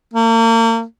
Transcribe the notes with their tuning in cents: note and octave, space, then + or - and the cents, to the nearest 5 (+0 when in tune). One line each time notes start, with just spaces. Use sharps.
A#3 -40